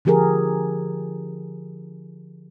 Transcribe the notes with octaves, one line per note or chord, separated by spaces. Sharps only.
D3 F3 G4 G#4 A#4